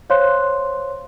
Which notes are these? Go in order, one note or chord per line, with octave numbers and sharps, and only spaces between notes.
C5 C#5 F5 C6 F#6